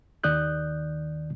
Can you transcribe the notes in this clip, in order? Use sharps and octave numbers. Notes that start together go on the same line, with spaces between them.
D#2 D#3 D5 D#6 F#6 G6